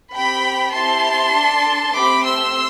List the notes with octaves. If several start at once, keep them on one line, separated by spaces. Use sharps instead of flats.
C4 G4 G5 B5
C4 E4 G4 A5 C6
D4 A4
A3 C4 G4 B5 D6
C6 E6